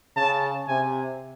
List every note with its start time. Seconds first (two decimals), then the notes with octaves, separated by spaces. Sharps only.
0.16 C#3 A5
0.68 C3 G#5